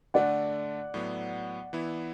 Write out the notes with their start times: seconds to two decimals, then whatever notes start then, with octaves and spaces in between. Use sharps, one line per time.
0.14 D3 A3 D4 D5 F#5
0.94 A2 F#3 B3
1.73 E3 B3 E4